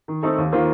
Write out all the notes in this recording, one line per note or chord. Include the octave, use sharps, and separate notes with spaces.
D#3
A3 C4 D#4 A4
D#2
D#3 A#3 F4 C5